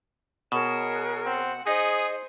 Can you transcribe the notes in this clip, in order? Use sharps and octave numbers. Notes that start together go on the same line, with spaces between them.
B2 G#4 A#4 C#5 E7
F#6
C4 F#5
D#4 G#4 C5 D#5